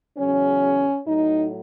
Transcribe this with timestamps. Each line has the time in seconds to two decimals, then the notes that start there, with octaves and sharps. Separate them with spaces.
0.17 E2 C#3 F#3 C#4
1.07 A2 F#3 D#4